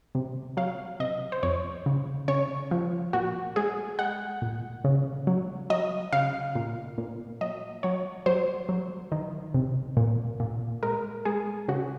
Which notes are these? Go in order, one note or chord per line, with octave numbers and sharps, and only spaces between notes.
C3
F#3 F5
C3 D#5
C5
F2 C#5
C#3
C#3 C#5
F3
A#2 F#4
G#3 G#4
G#3 F#5
A#2
C#3
F#3
F#3 D#5
C#3 F5
A#2
A#2
F#3 D#5
F#3 C#5
F#3 C5
F#3
D#3
C3
A#2
A#2
G#3 A#4
G#3 G#4
C#3 F#4